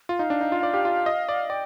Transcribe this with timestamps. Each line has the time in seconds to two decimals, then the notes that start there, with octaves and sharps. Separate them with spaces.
0.09 F4
0.19 D#4 F5
0.30 D4
0.41 D#4
0.52 F4
0.63 D5
0.74 G4
0.85 F4
1.06 D#5
1.29 D5
1.49 D5 G5